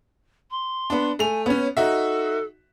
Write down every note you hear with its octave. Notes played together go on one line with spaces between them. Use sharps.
C6
B3 D4
A3 G#5 F7
B3 C#4 C#5
D#4 F#4 A4 E5